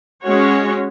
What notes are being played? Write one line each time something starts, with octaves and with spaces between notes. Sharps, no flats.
G#3 C#4 F#4 C#5